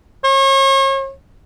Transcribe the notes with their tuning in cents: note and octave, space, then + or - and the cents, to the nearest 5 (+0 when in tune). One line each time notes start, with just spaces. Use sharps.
C#5 -40